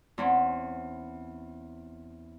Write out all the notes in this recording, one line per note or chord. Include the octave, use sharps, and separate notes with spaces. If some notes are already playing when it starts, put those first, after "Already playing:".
E2 C4 C#4